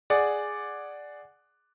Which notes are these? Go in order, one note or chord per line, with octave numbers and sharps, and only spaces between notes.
G#4 D5 F#5